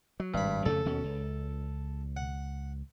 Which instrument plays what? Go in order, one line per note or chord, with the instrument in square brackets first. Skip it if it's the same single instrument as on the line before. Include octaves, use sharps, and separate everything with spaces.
[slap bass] F#3
[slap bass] G#1 [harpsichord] G2 B5
[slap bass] F2 C#3 A3 [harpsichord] A4
[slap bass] D#2 B2 C#4
C#2
[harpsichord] F#5